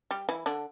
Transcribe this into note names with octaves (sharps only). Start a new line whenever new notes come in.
G3 G4
E3 E4
D3 D4